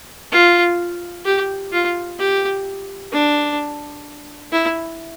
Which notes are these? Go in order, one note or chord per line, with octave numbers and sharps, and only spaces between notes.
F4
G4
F4
G4
D4
E4